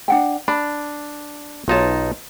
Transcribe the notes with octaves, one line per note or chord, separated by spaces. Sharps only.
D4 F#5 G5
D4 B5
B1 D#4 F4 C#5 A5